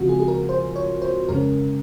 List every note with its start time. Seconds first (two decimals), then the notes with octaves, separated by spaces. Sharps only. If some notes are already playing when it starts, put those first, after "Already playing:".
Already playing: C#3 F3 G#3 C4 F4 F#4
0.09 G#4
0.20 G#4
0.28 A#4
0.49 C5
0.76 C#5
1.02 C5
1.29 F2 C#3 G#3 C#4 A#4